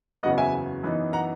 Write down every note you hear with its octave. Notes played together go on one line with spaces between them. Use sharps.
F#1 E2 C#3 F#3 B3 D#5 F#5
E5 G#5
F#2 E3 B3 D#4
F#5 A#5